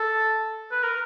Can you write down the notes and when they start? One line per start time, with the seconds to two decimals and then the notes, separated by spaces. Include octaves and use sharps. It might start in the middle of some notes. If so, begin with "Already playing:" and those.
Already playing: A4
0.71 B4
0.83 A#4